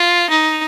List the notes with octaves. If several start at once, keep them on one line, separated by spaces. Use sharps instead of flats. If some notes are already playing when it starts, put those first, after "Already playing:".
Already playing: F4
D#4